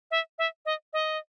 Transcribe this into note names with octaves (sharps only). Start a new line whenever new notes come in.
E5
E5
D#5
D#5